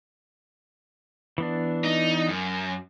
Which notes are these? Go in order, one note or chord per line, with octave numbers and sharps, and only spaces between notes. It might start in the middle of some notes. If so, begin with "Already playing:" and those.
E3 B3 D4
D#4
F#2